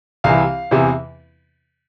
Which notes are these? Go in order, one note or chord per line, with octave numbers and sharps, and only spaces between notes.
C2 C3 E3 F5
E2 C3 E3